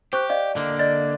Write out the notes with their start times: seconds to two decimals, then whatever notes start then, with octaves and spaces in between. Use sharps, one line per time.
0.13 G4 C5 C#6 F#6
0.29 D5 D#5 F5
0.56 D3 A#3
0.79 D5 D#5 A6